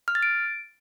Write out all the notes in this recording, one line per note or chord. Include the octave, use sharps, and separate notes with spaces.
F6
A6
D7